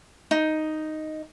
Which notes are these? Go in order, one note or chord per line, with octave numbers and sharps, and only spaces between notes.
D#4